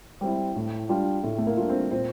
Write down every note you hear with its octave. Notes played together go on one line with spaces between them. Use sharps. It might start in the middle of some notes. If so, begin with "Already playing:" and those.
G3 C4 E4
A2
G3 D4 F4
A2 A3
A3
A#3
G3 D4 F4
C4
A#2 C4